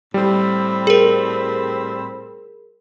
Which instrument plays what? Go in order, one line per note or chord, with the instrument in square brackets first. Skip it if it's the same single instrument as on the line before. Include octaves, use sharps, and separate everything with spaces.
[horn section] A2 C4 B5 [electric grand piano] G3
[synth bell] G#4 A#4